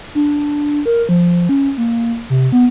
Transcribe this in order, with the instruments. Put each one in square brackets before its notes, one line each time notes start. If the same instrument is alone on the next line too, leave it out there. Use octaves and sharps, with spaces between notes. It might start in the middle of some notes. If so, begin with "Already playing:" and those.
[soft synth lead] D4
A#4
F3
C#4
A#3
C3
B3